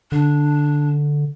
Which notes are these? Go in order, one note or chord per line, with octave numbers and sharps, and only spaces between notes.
D3 D4